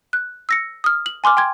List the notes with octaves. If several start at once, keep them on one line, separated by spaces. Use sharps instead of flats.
F#6
E6 A#6 C#7
D#6 F6
F#7
G#5 C6 D6 F6
G5 C6 G#6